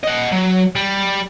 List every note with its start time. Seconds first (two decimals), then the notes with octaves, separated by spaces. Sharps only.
0.04 D#5 F#5
0.32 F#3
0.76 G3